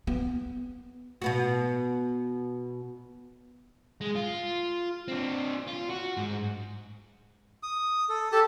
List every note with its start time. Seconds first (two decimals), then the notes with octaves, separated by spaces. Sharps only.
0.07 B3
1.22 B2 B3 F#4
4.01 G#3
4.15 F4
5.08 C4 D4
5.68 F4
5.90 F#4
6.17 G#2
7.63 D#6
8.09 A4
8.32 G4 A4 A5